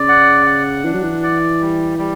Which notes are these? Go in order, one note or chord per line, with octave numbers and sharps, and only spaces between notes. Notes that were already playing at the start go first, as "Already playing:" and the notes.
Already playing: C#3 D5
F#5
F#5
E3 D4
F#3
E3
D5
G3
G3